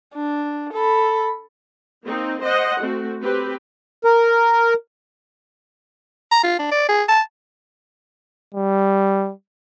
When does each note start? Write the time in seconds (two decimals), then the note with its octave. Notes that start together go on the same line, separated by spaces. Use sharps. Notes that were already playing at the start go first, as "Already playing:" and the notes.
0.15 D4
0.73 A4 B5
2.04 A#3 C4 D#4
2.43 C5 D#5 F#5
2.80 A3 C4 F#4
3.22 C4 G4 B4
4.05 A#4
6.31 A#5
6.43 F4
6.59 D4
6.72 D5
6.89 G#4
7.09 A5
8.55 G3